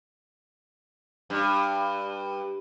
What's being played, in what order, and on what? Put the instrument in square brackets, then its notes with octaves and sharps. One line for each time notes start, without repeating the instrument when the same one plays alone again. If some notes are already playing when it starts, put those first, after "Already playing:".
[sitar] G2